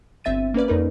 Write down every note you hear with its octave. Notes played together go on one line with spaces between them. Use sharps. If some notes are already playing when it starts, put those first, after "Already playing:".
G1 C4 E5 A6 D#7
A#3 C#4 B4 D5
F2 C#4 D#4 A#4 B4